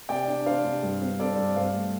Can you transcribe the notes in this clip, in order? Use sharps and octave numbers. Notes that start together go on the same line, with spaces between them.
C3 D5 G5
D4
D4 C5 F5
C3
G2
C4
C4 A4 D5
G2
G2 C5 F5
A3